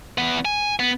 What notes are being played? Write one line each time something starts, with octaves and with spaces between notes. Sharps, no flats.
E2 B3
G#5
B3